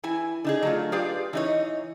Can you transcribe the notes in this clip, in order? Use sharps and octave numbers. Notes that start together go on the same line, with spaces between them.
E3 E4 G#5
D3 D#4 G#4
F#3 A3 F4
F4 G4 G#4 B4 D5 F5
E3 D#4 C#5